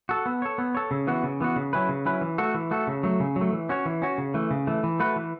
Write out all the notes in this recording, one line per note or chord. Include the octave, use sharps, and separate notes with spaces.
F#4 A4
B3
A4 C#5
B3
A4 C#5
C#3
E3 B3 F#4
C#3
E3 B3 F#4
C#3
F#3 C#4 E4 B4
C#3
F#3 C#4 E4 B4
E3
A3 F#4 A4
E3
A3 F#4 A4
C#3
F#3 A3
C#3
F#3
A3
E3
C#4 F#4 C#5
E3
C#4 F#4 C#5
C#3
E3 A3
C#3
E3 A3
E3
A3 F#4 B4
E3